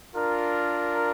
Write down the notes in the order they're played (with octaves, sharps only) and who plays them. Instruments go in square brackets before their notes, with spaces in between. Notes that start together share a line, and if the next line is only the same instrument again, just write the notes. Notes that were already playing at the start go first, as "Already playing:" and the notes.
[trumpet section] D4 F4 A#4